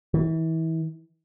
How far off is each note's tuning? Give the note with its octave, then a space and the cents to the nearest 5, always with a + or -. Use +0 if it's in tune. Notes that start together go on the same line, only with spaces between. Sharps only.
E3 -30